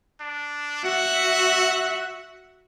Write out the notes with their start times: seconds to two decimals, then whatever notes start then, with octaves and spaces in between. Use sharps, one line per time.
0.21 D4
0.84 F#4 E5 F#5